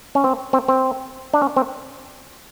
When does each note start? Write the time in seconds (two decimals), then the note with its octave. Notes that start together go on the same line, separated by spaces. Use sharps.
0.15 C#4
0.24 C4
0.53 C4
0.68 C4
1.34 D4
1.42 C#4
1.56 C4